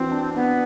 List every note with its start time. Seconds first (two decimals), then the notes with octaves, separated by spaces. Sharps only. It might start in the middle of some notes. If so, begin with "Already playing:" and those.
Already playing: E3 C4 D4 F#4
0.11 D4
0.35 B3 D4